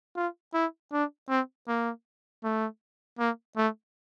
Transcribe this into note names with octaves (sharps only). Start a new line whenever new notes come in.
F4
E4
D4
C4
A#3
A3
A#3
A3